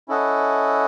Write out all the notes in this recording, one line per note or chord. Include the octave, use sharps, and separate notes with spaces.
C#4 E4 A4 D#5 F#5